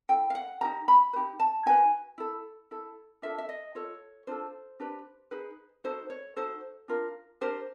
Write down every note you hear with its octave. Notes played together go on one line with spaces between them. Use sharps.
E4 A4 G5
F5
F#5
D#4 G4 A#4 A#5
B5
B4
D#4 G4
A5
D#4 F#4 B4 G#5
E4 A4
E4 A4
D4 F4 A4 E5
E5
D#5
F4 A4 C#5
D4 F4 A4 C5
D4 G4 B4
D#4 G#4 B4
D#4 F#4 A4 C5
C#5
D#4 F#4 A4 C5
D4 F4 A#4
D4 G4 A#4 C5